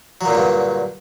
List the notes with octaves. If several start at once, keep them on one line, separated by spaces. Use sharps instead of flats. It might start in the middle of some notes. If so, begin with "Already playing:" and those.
G2 A#2 D3 F#3